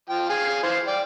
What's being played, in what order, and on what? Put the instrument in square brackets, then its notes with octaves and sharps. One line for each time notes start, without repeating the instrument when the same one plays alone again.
[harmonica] F3 G5
G#4 F5 G#5
E3 C5 F5
D5 G5